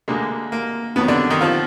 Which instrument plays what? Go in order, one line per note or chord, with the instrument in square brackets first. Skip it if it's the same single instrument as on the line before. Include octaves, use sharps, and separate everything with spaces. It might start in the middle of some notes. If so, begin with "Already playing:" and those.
[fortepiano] D2 D3 G#3 A#3
A#3
F2 D#3 F#3 B3
D3 D4
D#3 D#4
F3 F4